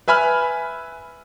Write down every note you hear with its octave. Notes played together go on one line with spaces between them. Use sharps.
B4 E5 G#5 B5 F6